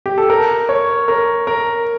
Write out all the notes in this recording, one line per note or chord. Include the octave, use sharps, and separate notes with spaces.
G4
A4
A#4
C#5
A#4
A#4